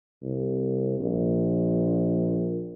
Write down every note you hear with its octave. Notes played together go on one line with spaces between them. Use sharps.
C2
A#1